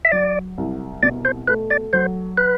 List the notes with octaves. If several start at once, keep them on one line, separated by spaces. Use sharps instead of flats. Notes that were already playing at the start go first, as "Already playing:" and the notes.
E5
F#3 D5
C2
B2 D5
C5
A3 B4
D5
F#3 C5
B4